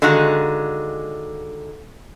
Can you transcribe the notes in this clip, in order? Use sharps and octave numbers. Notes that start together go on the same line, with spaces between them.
D3 D#3 G#3 F4 F#4